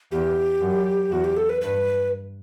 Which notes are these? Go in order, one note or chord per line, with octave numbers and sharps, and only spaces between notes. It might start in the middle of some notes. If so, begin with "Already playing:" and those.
E2 G4
F#2
E2 F#4
G4
A4
B4
G2 B4